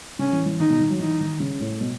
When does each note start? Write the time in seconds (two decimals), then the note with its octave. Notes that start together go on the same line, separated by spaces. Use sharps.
0.19 C#3 C#4
0.33 E3
0.46 E3
0.60 D#3 D#4
0.70 B2
0.80 D#3
0.90 F#3
1.00 E3 D#4
1.21 D#3
1.40 C#3
1.61 A2
1.81 B2